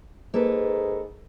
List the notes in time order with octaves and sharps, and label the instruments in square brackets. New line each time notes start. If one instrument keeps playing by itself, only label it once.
[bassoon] G#2 [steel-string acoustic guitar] A#3 A4 B4